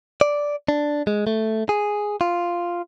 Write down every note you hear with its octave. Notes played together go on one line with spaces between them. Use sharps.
D5
D4
G#3
A3
G#4
F4